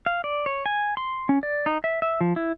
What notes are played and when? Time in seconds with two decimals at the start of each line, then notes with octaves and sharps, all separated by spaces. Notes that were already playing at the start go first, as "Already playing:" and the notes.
0.06 F5
0.24 D5
0.46 C#5
0.66 G#5
0.97 C6
1.29 C#4
1.43 D5
1.66 D#4
1.84 E5
2.02 E5
2.21 F3
2.36 E4